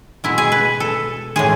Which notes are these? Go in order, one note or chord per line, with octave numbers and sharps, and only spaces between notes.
B2 G#3 E4
G#4
B4
A4
A2 E3 G#3 G#4